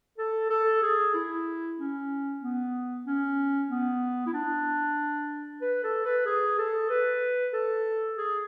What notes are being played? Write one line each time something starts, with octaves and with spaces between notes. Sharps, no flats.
A4
A4
G#4
E4
C#4
B3
C#4
B3
E4
D4
B4
A4
B4
G#4
A4
B4
A4
G#4